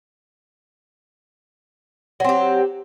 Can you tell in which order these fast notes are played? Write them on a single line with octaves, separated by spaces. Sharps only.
F#3 C4 G4